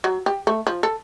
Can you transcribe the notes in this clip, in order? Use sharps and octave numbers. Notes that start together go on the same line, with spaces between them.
F#3
G4
A3
F3
A4